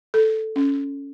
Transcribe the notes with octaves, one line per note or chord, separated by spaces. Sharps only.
A4
C#4